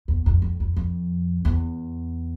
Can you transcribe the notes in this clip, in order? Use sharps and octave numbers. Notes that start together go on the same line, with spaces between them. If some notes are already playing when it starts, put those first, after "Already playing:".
E2
F2
F2
F2
F2
E2